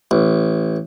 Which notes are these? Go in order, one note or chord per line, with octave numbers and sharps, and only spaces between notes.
A1